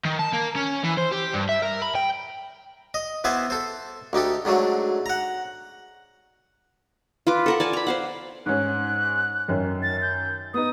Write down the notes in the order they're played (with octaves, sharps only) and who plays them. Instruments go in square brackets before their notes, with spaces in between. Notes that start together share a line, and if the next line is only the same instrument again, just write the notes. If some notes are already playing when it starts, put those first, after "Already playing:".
[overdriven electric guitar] D#3
A5
A#3
C#4
E3
C5
G4
G2
E5
A#4
B5
G5
[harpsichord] D#5
E3 B3 C5 E5 G#5
A4 C5
D2 D#4 G4 A4
G#2 D3 F#3 A3
F#5 A#5
[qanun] F4 B4 D6
A4 A#4 F#5
D5 G#5 A5
A#5 B5
C5 F5 F#5
[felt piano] G#2 C#4 [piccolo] F#6
[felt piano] F#2 D#3 C#4
[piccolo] A6
G6
[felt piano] B3 D#4 [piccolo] D#6